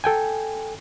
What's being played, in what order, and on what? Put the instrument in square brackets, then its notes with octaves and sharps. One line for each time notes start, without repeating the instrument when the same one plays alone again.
[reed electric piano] A4 G5 G#5